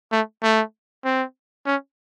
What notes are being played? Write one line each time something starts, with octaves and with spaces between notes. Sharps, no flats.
A3
A3
C4
C#4